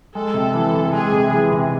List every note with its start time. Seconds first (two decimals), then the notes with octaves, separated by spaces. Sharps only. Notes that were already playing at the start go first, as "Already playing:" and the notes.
0.14 G#3 A4
0.34 C3
0.54 E3
0.73 C3
0.93 G#3 G#4
1.12 C3
1.31 E3
1.51 C3